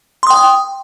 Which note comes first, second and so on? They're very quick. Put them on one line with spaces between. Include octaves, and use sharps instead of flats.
C6 D#6 G5